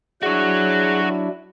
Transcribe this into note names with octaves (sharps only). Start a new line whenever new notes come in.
F#3 D4 E4 F#4 G#4 C#5 F#6